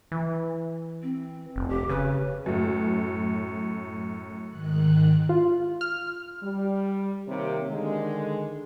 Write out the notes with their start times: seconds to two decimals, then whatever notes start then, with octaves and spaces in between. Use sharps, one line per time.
0.12 E3
1.02 C4
1.56 F1
1.69 G4
1.89 C#3 B4
2.46 F#2 A2
4.48 G#2 D#3 F#6
5.29 F4
5.81 F6
6.42 G3
7.28 C3 D#3 A#3 G4 C#5
7.70 D3 D#3 G#3